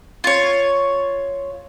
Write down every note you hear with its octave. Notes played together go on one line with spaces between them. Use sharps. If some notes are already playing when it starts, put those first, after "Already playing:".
F4 C#5